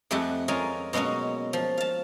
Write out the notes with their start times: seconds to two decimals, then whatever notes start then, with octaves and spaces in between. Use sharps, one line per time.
0.11 F2 G#3 A3 G4 F#5
0.48 G#3 C#4 F4 G#4 A#4
0.93 B2 F#3 G#3 A#3 C#4
1.53 F3
1.78 F5 A5